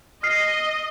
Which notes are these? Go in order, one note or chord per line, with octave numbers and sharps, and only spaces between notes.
D#5 F6 C7